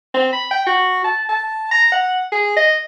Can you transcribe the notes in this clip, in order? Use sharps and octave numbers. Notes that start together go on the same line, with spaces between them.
C4
B5
G5
F#4
A5
A5
A#5
F#5
G#4
D#5